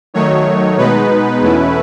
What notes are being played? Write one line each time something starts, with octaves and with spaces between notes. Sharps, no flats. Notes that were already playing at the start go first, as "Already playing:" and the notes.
D#3 F#3 A3 D#4 C#5
B2 G#3 B3 D#4 B4
E2 B2 A3 C#4 E4